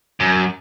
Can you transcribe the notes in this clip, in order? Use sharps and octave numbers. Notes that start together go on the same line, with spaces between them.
F#2